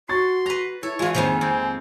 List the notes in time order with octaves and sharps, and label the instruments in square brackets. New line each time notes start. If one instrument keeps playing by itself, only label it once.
[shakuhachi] F#4 [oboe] C6 [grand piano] C#6 A6
[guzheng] B4 A#5 [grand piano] A#6
[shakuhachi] E4 [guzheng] A4 [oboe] C#5
[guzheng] E3 G#3 [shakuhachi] F4
[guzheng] F2 D#3 F3 [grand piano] A#2 C5 [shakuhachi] G#5
[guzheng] F2 [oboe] C4